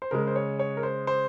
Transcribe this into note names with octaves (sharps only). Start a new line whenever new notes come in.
C5
C#3 G#3 A#4
C5
C#5
C#5
A#4
C5
C5